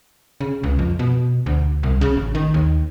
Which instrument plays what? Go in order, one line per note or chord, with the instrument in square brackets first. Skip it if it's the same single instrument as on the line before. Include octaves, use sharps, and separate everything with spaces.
[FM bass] C#3
C#2
F2
B2
D2
C2
C#3
A1
D#3
D#2